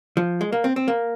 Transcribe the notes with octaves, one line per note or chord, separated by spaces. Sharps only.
F3
G#3
A#3
C4
C4
A#3